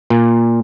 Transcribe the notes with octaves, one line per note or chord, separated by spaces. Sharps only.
A#2